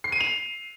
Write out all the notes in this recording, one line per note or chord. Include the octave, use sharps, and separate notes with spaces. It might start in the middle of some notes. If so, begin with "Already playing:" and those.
C7
D#7
F7